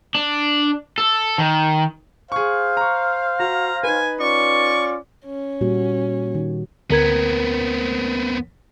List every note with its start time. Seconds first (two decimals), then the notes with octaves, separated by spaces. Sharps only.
0.15 D4
0.98 A4
1.38 D#3
2.32 G#4 C5 F5 C#6
2.77 A#5 C#6
3.40 F#4 A#5
3.83 D#4 B4 G#5
4.20 C#4 F4 D5 C#6
5.25 C#4
5.61 A#2 G3 F#4
6.35 D#3
6.90 D2 B3 C4 A#4 G#6